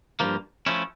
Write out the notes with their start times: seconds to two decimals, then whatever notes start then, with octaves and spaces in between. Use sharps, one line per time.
0.20 G2 F3 A#3
0.66 F3 A3 C#4 E4